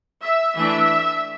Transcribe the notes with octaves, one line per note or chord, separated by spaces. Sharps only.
E5
E3 A3 D4 E5